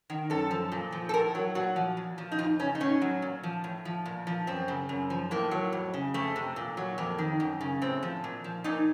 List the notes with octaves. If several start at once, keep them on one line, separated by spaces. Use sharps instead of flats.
D#3
F#2 A4
F3
A#2
F3
A4
A2 A#4
F#3
A#2 F#4
F3
A#2
F3
D#4
F2 F4
C#3 C#4
D#4
A2 C#4
F#3
A#2
F3
A2
F3
A#2
F3
F#2 C4
C#3
F#2
F3
A2 A#3
F#3
F2
C#3
F2 A3
C3
A#2
F#3
F2 A#3
D#3
F#2
C#3
A2 C4
F3
A#2
F3
A#2 D#4